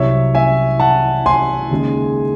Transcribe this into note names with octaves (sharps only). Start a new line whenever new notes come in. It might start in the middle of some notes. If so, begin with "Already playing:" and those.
Already playing: C2 C3 F#3 C#5 E5
E5 G#5
F#5 A5
G#5 C6
D#2 C#3 G#3